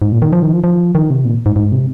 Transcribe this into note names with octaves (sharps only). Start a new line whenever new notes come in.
G#2
A#2
D#3
F3
D#3
F3
F3
D#3
C3
A#2
G#2
G#2
C3